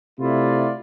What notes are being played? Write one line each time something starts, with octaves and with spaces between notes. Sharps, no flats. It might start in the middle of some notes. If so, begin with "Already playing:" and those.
C3 A3 E4 F4 D5